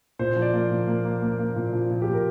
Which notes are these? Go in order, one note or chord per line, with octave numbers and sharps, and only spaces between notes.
A#2 C5
F3
D5
A#3
A#2
A#3
A#3
A#3
A#3
A#2
F3
A#2
G4
A#2
A#4